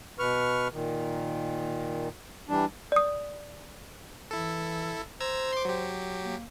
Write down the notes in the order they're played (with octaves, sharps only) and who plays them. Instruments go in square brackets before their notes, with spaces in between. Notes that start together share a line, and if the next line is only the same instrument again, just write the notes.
[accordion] B2 B4 C#6 F6
A#2 D#3
E3 G3 D4
[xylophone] D5 D#6
[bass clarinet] E3 [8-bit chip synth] E4 A4
[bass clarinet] C5 [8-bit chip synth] A#5 E6 G#6
[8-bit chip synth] C6 D6
F#3 G4
[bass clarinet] A#3